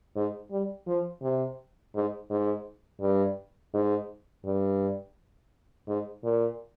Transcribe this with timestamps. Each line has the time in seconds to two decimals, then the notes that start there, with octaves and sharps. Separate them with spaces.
0.16 G#2
0.51 G3
0.87 F3
1.22 C3
1.95 G#2
2.30 G#2
3.01 G2
3.74 G#2
4.45 G2
5.88 G#2
6.24 A#2